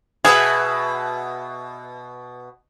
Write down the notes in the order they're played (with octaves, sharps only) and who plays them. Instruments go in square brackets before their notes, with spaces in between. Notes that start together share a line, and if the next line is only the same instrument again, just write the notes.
[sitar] B2 B4 E5 [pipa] G#4